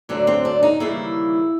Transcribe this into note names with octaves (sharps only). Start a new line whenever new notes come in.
D2 D3 F#3 D4
C4
D4
D#4
D#2 C#3 E3 G3 A#3 E4